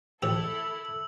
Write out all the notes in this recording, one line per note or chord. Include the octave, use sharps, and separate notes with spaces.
A1 E4 G4 A4 E6 F7 F#7